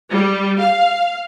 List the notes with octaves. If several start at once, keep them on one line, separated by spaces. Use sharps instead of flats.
G3
F5